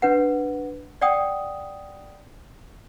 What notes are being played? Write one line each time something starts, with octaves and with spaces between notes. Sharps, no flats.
D4 B4 F#5
D5 F#5 G5 D#6